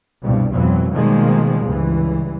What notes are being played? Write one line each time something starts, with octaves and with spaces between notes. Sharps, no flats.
C2 G2 B2 G3
G#1 F2 B2 E3 F#3
B2 D#3 F3 G3 G#3 A#3
C#2 G2 E3